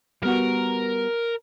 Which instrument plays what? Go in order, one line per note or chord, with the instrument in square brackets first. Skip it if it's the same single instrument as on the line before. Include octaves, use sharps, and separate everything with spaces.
[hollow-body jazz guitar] G3 B3 F#4 [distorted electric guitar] A#4